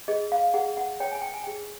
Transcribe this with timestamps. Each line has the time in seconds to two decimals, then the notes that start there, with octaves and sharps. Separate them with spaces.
0.08 G#4 D#5
0.32 F5
0.54 G#4 F#5
0.77 F#5
1.00 C#5 G5
1.12 G#5
1.22 G5
1.34 G#5
1.44 G#4 G5